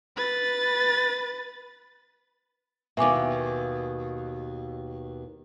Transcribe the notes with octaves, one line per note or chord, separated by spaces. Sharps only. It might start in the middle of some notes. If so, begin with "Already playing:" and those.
B4 A6
D#2 B2 E5 G#5 D6